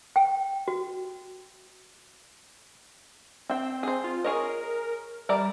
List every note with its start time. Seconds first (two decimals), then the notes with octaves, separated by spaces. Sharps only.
0.16 G5
0.68 F#4
3.49 C4 E5 G5
3.83 G#4 C5
4.04 F4
4.24 G#4 A#4 C#5 D#5
5.29 G3 A#4 D5 E5